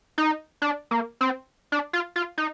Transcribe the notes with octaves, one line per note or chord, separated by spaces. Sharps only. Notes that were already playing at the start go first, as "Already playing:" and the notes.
D#4
D4
A#3
C4
D4
F4
F4
D#4